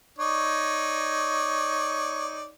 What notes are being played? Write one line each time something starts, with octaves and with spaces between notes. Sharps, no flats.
D#4 C#5 D5